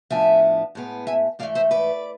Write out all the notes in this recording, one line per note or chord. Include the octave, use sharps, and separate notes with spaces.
A2 F3 B3 D4 E5 G#5
A2 G#3 B3
E5 G#5
G#2 E3 A3 D5 F5
C5 E5
B4 D5